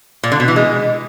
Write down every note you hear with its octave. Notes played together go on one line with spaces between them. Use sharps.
A#2
D3
B2
E3
G#3